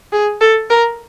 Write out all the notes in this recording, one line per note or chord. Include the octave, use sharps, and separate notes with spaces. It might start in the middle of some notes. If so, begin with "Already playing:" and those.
G#4
A4
A#4